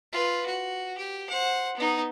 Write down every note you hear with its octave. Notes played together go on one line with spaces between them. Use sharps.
F4 B4
F#4
G4
C5 F#5
B3 D#4